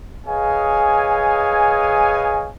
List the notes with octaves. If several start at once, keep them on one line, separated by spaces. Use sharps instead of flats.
G#4 B4 C#5 D#5 F5 G#5